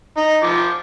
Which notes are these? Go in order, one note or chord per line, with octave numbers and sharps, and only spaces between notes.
D#4
F3 D6